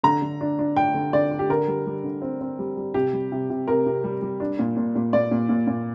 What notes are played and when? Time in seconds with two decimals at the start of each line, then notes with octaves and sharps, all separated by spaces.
0.03 D3 A#5
0.22 D3
0.41 D4
0.59 D4
0.76 D4 G5
0.94 D3
1.13 D3 D5
1.31 D4
1.39 G4
1.49 D3 A#4
1.68 G3
1.86 G3
2.04 D3
2.22 C4
2.41 C4
2.59 G3
2.77 G3
2.94 C3 G4
3.13 G3
3.32 C3
3.50 C3
3.68 C3 A#4
3.86 C3
4.04 G3
4.22 G3
4.40 D4
4.59 A#2
4.77 A#2
4.96 A#2
5.13 A#2 D5
5.31 A#2
5.49 A#2
5.67 A#2